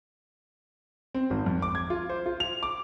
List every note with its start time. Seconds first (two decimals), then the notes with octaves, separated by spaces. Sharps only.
1.14 C4
1.30 G#1
1.46 F2
1.62 D6
1.75 G#6
1.90 F4
2.10 C5
2.26 F4
2.40 F7
2.63 D6